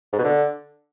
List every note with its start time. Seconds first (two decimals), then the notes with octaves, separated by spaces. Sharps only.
0.13 G#2
0.18 B2
0.24 D3